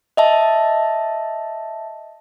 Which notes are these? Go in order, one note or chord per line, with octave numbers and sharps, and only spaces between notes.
D#5 E5 A5